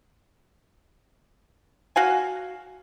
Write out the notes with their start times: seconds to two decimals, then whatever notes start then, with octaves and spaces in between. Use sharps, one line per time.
1.96 F#4 F5 G#5